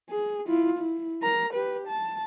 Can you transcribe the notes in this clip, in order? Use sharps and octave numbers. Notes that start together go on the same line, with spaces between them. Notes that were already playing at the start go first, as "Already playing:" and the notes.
G#4
E4 F4
E4
A#4 A#5
G4 B4
A5